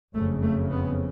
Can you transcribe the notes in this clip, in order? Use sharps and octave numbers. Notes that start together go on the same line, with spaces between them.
F#1 F2 C#3 A3
A3
B3